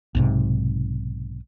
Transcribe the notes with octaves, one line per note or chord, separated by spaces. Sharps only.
B1 G#2 C3